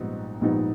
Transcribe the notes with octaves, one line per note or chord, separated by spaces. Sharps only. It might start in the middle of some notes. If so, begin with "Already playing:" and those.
Already playing: A#1 G#2 G3 B3 D#4
A#1 G#2 G3 B3 D#4